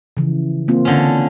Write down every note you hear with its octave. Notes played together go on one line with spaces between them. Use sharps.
C#3 E3 F3
A#3 C4 F4
D3 C#4